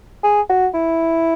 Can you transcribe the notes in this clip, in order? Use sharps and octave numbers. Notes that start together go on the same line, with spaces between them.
G#4
F#4
E4